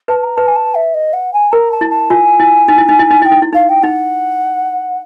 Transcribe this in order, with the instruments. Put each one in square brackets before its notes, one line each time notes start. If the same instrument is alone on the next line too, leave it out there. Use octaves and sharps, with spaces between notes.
[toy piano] B4 [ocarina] A5
[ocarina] A#5
[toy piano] B4 [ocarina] A5
[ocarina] G#5
A5
E5
D#5
F#5
G#5
[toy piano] A#4 [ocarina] A#5
[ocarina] A5
[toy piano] E4
[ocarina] A5
[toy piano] F4 [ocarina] G#5
[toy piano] E4
D#4
E4
D#4
E4
D#4
[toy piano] E4 [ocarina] G5
[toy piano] D#4
E4
[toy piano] D#4 [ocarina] F5
[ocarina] G5
[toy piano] D#4 [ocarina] F#5